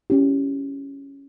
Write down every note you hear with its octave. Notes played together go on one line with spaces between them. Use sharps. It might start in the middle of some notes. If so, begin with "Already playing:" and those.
C#4 E4 G4